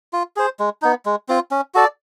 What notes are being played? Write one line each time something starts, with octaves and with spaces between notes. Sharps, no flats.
F4
G#4 C5
G#3
B3 D#4
G#3
C4 F4
C#4
F#4 A4 D5